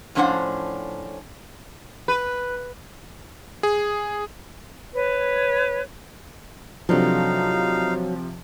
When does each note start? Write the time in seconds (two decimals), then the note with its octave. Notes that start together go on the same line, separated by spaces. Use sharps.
0.15 A2 F3 C#4 D4 C5 F#5
2.08 B4
3.63 G#4
4.94 B4 C#5
6.89 C3 F3 F#3 D4 D#4 A4 F5